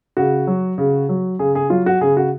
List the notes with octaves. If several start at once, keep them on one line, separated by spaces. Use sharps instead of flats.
C#3 F#4
F#3
C#3
F#3
C#3 G#4
G#4
F#3 F4
F#4
C#3 G#4
F#4